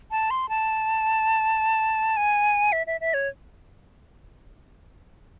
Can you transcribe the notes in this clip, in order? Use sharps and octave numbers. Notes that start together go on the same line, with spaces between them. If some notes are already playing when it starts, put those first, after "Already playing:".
A5
C6
A5
G#5
E5
E5
E5
C#5